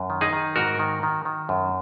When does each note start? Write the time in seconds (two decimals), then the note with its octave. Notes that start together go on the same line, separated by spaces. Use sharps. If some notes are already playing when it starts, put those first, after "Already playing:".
Already playing: F#2
0.10 D#3
0.21 D#4 G#4
0.33 D#3
0.56 G#2 F#4 A#4
0.79 D#3
1.03 D#3
1.25 D#3
1.49 F#2